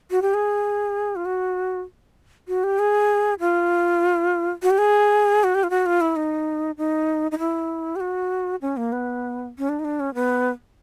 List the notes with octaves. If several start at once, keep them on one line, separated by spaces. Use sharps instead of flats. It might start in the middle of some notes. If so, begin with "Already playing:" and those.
F#4
G4
G#4
F4
F#4
F#4
G4
G#4
F4
F#4
G4
G#4
F#4
G4
F4
F#4
F4
E4
D#4
D#4
D#4
E4
G4
F#4
C#4
A#3
B3
C#4
D4
D#4
D4
C#4
B3